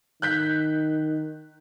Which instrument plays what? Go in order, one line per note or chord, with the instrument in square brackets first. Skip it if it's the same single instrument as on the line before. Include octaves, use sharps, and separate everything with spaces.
[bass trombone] D#3 [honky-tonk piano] F#6 G6 B6